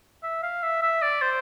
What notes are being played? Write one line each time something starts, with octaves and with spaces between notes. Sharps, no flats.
E5
F5
E5
E5
D5
C5